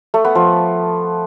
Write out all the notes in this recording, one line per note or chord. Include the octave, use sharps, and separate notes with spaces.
A3
B3
F3